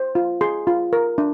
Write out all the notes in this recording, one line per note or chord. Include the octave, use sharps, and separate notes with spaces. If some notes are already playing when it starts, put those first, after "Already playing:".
Already playing: C5
F4
G#4 C6
F4
A#4
D4